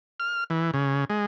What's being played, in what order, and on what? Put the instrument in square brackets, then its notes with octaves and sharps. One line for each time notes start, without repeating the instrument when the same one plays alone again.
[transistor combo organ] F6
E3
C#3
G#3